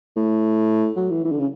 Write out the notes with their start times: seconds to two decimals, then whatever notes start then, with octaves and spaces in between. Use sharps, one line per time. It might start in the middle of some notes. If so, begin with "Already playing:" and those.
0.16 A2
0.97 F#3
1.10 E3
1.24 E3
1.32 D3
1.39 C#3